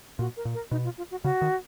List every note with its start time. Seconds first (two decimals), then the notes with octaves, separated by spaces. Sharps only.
0.19 A#2 F#4
0.37 A#4
0.45 A#2
0.54 A#4
0.71 B2 D#4
0.84 F4
0.98 F4
1.11 F#4
1.24 C#3 F#4
1.42 D#3